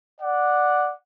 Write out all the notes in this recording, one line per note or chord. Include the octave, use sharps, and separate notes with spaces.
D5 F#5